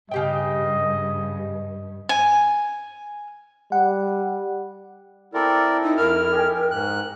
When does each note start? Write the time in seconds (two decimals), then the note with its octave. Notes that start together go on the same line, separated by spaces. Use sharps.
0.11 G2 C#3 G4 D#5 G5
2.09 G#5
3.72 G3 F#5
5.34 C4 E4 A4 A#4 C5 D5
5.83 D#4
5.97 F2 A#4 F6
6.32 G4 D#5 G#5
6.71 G#2 F#6